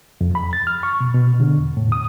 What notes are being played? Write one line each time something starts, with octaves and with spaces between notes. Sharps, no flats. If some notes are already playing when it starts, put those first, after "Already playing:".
F2
B5
A6
F6
C#6
B2
B2
D3
E2
A2
D#6